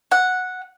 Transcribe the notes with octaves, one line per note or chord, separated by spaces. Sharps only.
F#5